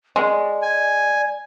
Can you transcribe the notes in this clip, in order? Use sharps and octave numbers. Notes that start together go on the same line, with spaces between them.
G#3 D5
G#5